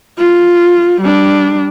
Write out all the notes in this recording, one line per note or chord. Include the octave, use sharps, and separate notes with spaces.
F4
G3 D4